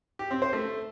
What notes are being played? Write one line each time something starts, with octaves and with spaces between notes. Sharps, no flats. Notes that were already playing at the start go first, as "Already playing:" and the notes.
G4
C4
C5
A3